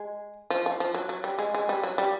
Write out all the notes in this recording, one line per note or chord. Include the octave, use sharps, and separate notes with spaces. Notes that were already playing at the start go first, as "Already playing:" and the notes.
Already playing: G#3
F3
F3
F3
F#3
F#3
G3
G#3
G#3
G3
F#3
G3